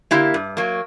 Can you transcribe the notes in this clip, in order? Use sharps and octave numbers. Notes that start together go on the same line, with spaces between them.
D3 A#3 E4 G4
G2
F#3 A#3